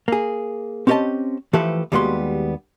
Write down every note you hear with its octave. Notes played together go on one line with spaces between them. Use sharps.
A#3 G#4
C4 C#4 G4 C5 D#5 A5
E3 F3 A3 G4 A4 B4
D#2 G3 G#3 B3 F#4 C6